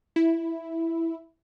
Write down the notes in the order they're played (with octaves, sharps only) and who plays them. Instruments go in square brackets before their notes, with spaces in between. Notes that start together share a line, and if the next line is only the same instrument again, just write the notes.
[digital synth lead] E4